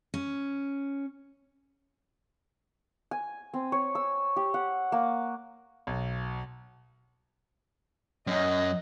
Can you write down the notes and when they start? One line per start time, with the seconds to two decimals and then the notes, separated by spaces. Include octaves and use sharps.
0.14 C#4
3.11 G#5
3.54 C4
3.72 C#5
3.95 E6
4.36 G4
4.54 F#5
4.92 A#3
5.87 B1
8.27 F#2 C#4 D#5